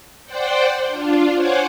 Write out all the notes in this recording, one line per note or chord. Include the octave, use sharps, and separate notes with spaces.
C5 D5 F#5 G5
D4 F4
C5 C#5 F#5 G#5 D6